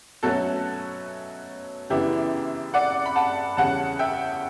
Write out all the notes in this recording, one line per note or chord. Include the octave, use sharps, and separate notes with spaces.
B2 F#3 A3 C#4 F#4 A4
F#2 C#3 E3 B3 D4 E4 G4
D5 F#5
B5
F#5 A5
E2 C#3 G3 C#4 F#5 A5
E5 G5